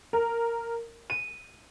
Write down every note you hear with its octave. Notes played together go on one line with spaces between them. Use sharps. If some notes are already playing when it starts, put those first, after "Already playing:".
A#4
D#7